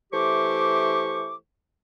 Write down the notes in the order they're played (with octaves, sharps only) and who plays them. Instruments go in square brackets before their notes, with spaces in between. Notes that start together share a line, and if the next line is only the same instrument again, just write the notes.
[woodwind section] E3 A3 G4 C5 C#6 D6